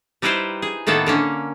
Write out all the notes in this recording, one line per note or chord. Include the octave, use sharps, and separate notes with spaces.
G3 D#4 E4 B4 C5 G5
G#4
A2 D#3 A#3 B3 A4
D3 A#3 C#4